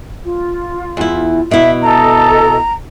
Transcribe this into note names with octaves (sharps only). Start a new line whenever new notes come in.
F4
E2 E4
B2 E4 E5
A4 D#5 A#5